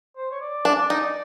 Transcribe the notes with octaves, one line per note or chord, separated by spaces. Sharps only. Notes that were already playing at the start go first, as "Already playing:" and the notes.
C5
C#5
D5
D4
D#4